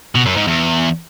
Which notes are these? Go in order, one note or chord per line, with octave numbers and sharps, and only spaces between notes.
B2
F#2
G#2
E2